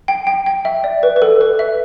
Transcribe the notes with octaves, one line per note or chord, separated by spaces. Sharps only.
G5
G5
G5
E5
D5
B4
B4
A4
B4
E5